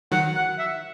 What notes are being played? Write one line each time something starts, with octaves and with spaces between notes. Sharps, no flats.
D#3 F#3 F#5
F#5
E5